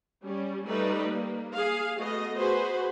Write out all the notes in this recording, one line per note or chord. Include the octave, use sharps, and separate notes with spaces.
G3 C#4
G3 A3 D#4 B4
A#3
G#4 F5
A3 B3 F#4 D#5
F#4 G#4 B4 C5